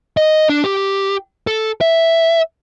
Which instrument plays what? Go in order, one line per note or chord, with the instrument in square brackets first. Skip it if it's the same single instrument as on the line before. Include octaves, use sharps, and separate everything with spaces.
[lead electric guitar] D#5
D4
G4
A4
E5